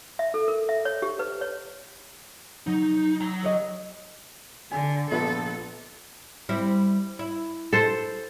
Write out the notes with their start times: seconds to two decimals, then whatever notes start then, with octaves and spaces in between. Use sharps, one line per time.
0.19 E5
0.34 A4
0.48 A#4
0.69 E5
0.85 C#5
1.02 G4
1.19 B4
1.41 C#5
2.67 F#3 D#4
3.21 F#3 A#5 D#6 C7
3.43 G4 C#5 D#5
4.72 D3 G#5
5.11 A#1 B3 A4 B4
6.49 G3 C4 E4
7.19 E4
7.73 A4 C5